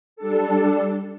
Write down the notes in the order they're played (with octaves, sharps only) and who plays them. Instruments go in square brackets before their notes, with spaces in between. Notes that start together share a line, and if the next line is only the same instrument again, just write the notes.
[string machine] G3 D4 A4